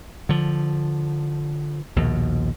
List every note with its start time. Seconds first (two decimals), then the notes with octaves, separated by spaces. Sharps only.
0.29 D3 F3
1.96 A#1 D#2 B2